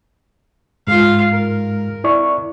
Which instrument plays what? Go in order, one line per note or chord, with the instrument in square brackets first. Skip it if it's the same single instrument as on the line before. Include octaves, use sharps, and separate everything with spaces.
[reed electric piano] G#2 G#3 [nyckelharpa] F4 F5
[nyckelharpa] A#4
[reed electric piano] E4 D5 C#6